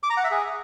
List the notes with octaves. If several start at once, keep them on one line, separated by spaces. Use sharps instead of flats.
D6
A#5
F#5
E5
G#4